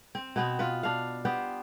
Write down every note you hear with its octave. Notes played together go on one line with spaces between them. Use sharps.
C4
B2 B3 C4
F4 B4
D4 F5
B3 G4 C5